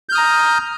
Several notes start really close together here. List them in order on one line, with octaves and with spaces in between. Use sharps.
G6 F6 D#6 A#5